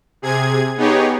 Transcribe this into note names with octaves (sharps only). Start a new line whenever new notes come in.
C3 G#4 G#6
B3 D#4 G4 G#4 C#5